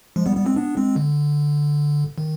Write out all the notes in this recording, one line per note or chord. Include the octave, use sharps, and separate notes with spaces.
F3 G#3
G3 B3
G3 B3
G#3 C4
B3 D4
G#3 C4
D3
D#3